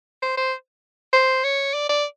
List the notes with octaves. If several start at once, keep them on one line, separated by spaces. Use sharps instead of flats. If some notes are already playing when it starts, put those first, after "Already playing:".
C5
C5
C5
C#5
D5
D5